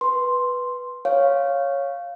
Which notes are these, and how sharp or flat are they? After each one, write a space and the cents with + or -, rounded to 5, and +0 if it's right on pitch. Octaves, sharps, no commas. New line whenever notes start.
B4 -5 C6 +0
C#5 +0 F5 +0